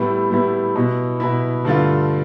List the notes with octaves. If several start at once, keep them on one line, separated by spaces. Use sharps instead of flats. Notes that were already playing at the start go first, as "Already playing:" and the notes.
Already playing: A2 G3 B3 E4
A2 G3 B3 E4
B2 B3 E4
B2 B3 E4
G2 D3 A3 D4 F4